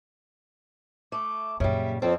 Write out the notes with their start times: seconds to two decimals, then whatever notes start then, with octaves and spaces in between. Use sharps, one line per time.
1.12 A3 D6
1.60 F#2 A#2 C#3 G3 E5
2.02 F2 C4 A4 C#5